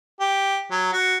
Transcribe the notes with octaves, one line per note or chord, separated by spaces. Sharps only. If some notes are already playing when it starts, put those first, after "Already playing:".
G4
F#3
F#4